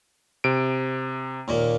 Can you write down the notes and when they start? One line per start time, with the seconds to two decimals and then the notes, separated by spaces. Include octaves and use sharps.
0.44 C3 D7
1.48 D#2 A#2 A#3